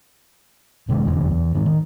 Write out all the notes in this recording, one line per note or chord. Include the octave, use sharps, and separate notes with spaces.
F#1 C3 D#3 G#3
F1 E2 D3
E2
G#2 D#3
D#3